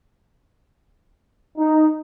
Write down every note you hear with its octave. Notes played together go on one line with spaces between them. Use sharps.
D#4